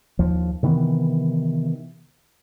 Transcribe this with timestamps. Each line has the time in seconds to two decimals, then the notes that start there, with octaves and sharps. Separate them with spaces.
0.19 D#2 F3
0.63 C3 D#3 E3 B3